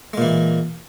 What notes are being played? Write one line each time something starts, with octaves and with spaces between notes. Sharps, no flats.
A#2 E3 G#3